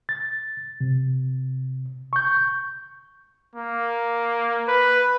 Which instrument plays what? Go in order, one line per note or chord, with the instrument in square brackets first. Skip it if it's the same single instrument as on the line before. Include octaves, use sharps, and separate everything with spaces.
[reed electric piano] A6
C3
C#6 G6
[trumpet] A#3
B4